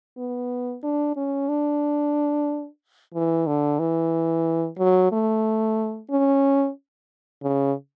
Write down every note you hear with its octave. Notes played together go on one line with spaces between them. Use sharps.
B3
D4
C#4
D4
E3
D3
E3
F#3
A3
C#4
C#3